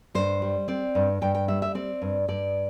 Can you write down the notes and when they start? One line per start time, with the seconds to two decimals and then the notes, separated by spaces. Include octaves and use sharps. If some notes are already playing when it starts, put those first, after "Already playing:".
0.15 G2 C5
0.42 G3
0.68 C4 D5
0.95 G2
1.21 G2 G5
1.35 G5
1.48 G3 E5
1.62 E5
1.75 C4 D5
2.02 G2
2.28 G2 D5